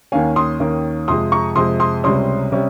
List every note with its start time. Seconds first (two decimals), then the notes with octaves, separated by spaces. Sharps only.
0.12 D#2 D#3 A#3 C#4 F5 G#5
0.36 C6 D#6
0.60 D#2 D#3 A#3 C#4
1.08 F2 C3 F3 G#3 C6 D#6
1.32 A#5 C#6
1.56 F2 C3 F3 G#3 C6 D#6
1.80 C6 D#6
2.04 C#2 C3 G3 C#4 C6 D#6
2.52 C3 G3 C#4